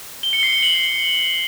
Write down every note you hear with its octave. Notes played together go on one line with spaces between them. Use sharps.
G7
C#7
C7
G7
F#7